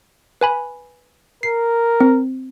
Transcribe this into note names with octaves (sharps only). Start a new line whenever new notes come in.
B4 G#5 B5
A#4 C7
C4